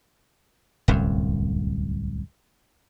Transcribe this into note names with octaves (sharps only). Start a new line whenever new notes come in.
D1 C2 F#2